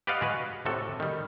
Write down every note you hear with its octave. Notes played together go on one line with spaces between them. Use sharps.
G4 B4 D5 D#5 F5 F#5
G#3 F#4 B4
A2 C3 F#4 A4
D#3 G3